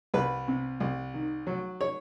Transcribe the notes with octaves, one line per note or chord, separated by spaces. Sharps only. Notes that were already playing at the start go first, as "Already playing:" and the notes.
C2 B4
C3
C2
D#3
F#3
C#5